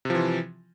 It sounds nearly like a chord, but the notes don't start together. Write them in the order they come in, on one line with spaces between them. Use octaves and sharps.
C3 F3 E3